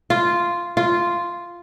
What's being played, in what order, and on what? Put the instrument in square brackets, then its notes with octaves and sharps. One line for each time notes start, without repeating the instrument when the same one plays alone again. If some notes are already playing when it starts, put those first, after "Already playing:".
[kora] F4
F4